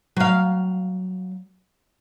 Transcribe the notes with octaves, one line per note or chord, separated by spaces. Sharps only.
F#3 F5